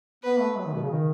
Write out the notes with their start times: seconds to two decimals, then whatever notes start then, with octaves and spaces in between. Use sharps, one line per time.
0.23 B3 B4
0.40 A3
0.57 F#3
0.66 D#3
0.75 B2
0.82 C#3
0.91 D#3